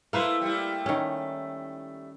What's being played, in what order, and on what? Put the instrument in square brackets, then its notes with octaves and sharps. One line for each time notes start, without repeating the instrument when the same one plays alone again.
[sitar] A3 E4 A4 [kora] A#3 B4 C5
[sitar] G3 A3 E4
[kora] D#3 C#4